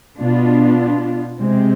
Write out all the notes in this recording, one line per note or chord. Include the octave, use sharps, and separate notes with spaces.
B2 B3 D4 F4
C3 G#3 C4